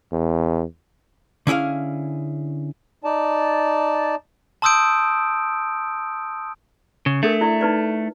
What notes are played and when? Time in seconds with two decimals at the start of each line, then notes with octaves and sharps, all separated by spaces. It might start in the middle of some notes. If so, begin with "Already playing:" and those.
0.12 E2
1.47 D3 C#4 E4 G#4 F5
3.04 D#4 D5 A5
4.62 A5 C6 D#6 E6 G6 D7
7.06 C#3
7.23 A3 D4 A4 A#4
7.41 E4 D5 E5
7.61 D#4 B4 D5